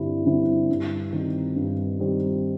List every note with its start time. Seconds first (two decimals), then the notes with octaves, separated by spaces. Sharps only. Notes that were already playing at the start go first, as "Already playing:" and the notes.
Already playing: G2 D3 G3 C4 E4
0.25 D3 G3 C4 E4
0.69 G2
1.13 D#3 G3 C4 D#4
1.56 G2
1.99 D#3 G3 C4 D#4